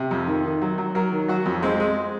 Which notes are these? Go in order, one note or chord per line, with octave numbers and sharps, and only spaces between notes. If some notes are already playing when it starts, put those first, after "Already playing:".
Already playing: C3
F2
D#3
D#3
F#3
F#3
F#3 A#4
D#3
F#3 F#4
F2
G#3 C4
G#3